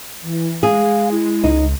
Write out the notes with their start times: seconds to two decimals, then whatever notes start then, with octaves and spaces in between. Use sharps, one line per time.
0.22 E3
0.63 G#3 G#4 F5
1.12 E4
1.44 C#2 D#4